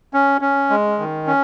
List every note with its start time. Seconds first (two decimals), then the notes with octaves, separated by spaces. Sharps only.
0.14 C#4
0.41 C#4
0.70 G#3
0.98 D#3
1.27 C#4